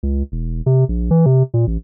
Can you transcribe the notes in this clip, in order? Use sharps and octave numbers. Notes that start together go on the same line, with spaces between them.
C#2
E1
C3
A#1
E3
C3
A#2
A1